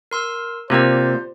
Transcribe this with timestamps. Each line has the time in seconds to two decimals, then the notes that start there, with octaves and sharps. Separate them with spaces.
0.11 A#4 C6 E6
0.70 C3 A#3 C4 F4 G4 C5 D5